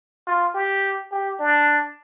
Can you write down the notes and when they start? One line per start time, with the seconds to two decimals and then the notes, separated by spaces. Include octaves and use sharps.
0.27 F4
0.55 G4
1.12 G4
1.40 D4